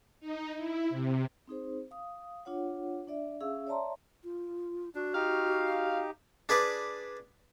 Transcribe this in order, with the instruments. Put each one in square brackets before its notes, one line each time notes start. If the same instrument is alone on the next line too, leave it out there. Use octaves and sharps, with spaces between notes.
[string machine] D#4
E4
C3
[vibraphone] C4 D#4 G#4 C5
F5 D#6
D4 F4 C#5 F#5
D4 D5 E5
C#4 G#4 E5 F5 E6
C#5 D5 E5 A5 A#5 C6
[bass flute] F4
[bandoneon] D4 [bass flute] F#4
[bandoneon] D#4 G4 [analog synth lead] F5
[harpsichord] D4 G#4 B4 D5